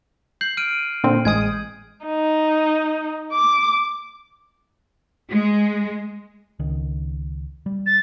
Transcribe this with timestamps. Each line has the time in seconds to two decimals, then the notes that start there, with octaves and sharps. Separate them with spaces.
0.41 G6 C7 F#7
0.57 F6 D7 D#7
1.04 A#2 D3 C4
1.25 A1 G#3 D#6 G#6
2.06 D#4
3.33 D6
5.31 G#3
6.59 C#2 D#3
7.66 G3
7.86 A6